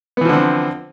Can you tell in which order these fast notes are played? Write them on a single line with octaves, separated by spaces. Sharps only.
B3 E3 F3 D3 C4